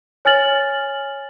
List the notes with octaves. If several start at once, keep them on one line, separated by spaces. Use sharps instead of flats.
C#5 G#5 F6 A6 F#7